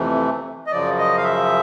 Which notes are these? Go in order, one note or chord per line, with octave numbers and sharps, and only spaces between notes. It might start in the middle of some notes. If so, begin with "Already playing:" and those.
Already playing: F2 C3 E3 A3
D#5
F#2 C#3 F3 D5
D#5
F5
E5